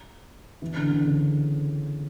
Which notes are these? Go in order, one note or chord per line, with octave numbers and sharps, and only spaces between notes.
E3
D3
D3
C#3